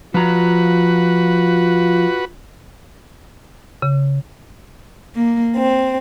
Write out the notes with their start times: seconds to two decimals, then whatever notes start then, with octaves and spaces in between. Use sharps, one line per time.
0.14 F3 F4 F#4 B4 A#5
3.82 C#3
5.17 A#3
5.56 C4